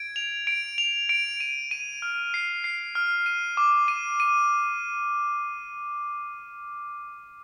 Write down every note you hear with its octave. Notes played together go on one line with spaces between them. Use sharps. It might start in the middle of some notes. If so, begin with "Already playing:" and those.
Already playing: G#6 D7
F7
D7
F7
D7
D#7
D#7
F6
C7
C7
F6
D#7
D6
D#7
D#7